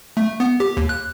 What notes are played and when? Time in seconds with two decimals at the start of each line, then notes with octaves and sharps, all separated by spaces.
0.17 A3
0.40 B3
0.60 G4
0.77 D#2
0.89 F#6